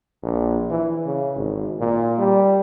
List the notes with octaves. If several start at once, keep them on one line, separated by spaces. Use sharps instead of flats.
A#1
E3
C#3
G#1
A#2
G3